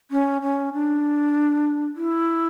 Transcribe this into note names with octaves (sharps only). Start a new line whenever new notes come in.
C#4
C#4
D4
E4